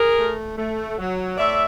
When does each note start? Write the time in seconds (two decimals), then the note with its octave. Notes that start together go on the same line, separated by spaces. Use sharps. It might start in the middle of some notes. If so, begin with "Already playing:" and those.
Already playing: G#4 A#4
0.17 A3
0.57 A3
0.98 F#3
1.38 A2 D5 E5